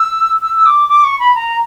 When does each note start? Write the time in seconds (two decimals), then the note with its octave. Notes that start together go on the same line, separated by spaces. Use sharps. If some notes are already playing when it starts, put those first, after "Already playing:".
Already playing: E6
0.42 E6
0.57 E6
0.66 D6
0.89 D6
1.04 C#6
1.20 B5
1.35 A#5